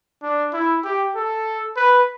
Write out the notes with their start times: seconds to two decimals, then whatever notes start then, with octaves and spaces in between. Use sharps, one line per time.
0.23 D4
0.53 E4
0.84 G4
1.16 A4
1.77 B4